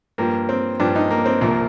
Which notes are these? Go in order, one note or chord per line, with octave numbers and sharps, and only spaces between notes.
G2 F3 A#3
C4
G2 F3 D4
D#4
A#3
C4
C2 A#2 F3 A#3